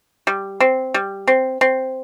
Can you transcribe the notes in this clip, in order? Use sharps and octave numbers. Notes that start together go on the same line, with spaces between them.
G3
C4
G3
C4
C4